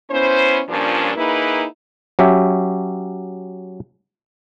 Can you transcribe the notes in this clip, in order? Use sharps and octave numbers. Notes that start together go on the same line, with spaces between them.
B3 C#4 E4 C5
G2 A#2 F3 C#4 D4
A#3 D#4 E4 G#4 B4
F#3 C#4 G4 E5